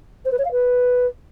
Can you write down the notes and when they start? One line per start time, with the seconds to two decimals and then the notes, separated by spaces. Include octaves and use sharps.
0.25 C5
0.31 B4
0.38 C#5
0.45 F5
0.51 B4